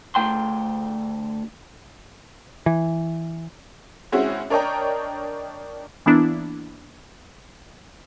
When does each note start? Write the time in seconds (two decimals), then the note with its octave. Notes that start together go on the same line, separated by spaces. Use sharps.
0.15 D2 A3 G5 C6
2.66 E3
4.12 G#3 C4 C#4 E4 F#4
4.50 D4 A#4 C#5 D#5 G5 A#5
6.06 E3 A#3 B3 D4 E4